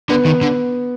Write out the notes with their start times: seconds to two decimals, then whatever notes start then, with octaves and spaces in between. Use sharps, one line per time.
0.10 D3 B3
0.26 D#3
0.43 D3